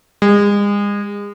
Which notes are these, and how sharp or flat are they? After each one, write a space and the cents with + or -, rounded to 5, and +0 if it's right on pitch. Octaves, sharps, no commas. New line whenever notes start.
G#3 -35